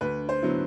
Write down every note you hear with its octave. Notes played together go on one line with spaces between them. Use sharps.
D2 B4
C5
D3 F#3 B3 E4